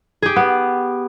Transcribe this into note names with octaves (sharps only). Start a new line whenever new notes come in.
G4 G#4
B3